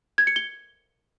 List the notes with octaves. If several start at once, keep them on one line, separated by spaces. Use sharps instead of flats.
G#6
C#7
G7